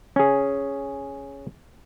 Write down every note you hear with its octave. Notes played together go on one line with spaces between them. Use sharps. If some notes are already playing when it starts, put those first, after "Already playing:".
C#4 G#4